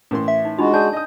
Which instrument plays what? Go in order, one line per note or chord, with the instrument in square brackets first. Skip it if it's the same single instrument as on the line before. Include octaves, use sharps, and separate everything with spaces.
[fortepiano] A2 E3 C6 [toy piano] C#4 A#4
[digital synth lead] E5
[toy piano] D#4
[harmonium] G#3 F#4 [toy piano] D4 D#4 B5 [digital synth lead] F4
[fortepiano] D4 G#4 [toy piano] D5 G#5 A5 [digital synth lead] G6
[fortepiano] D#5 D#6